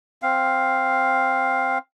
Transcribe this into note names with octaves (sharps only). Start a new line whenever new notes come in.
C4 F5